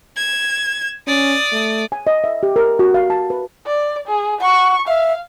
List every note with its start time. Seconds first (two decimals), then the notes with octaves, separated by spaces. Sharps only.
0.16 G#6 E7
1.07 C#4 D5 D#6
1.52 A3
1.92 G#5
2.07 D#5
2.24 E5
2.43 G4
2.56 A#4
2.79 F#4
2.94 F5
3.10 A5
3.30 B4
3.66 D5
4.07 G#4
4.41 F#5 C#6
4.88 E5 F5